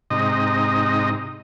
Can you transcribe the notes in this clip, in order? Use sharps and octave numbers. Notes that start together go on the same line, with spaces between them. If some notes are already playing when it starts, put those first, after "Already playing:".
G#2 C3 D#4 D#5